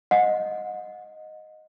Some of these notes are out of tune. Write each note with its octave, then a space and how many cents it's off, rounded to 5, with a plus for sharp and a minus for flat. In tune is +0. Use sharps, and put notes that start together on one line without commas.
D#5 +0 F#5 -35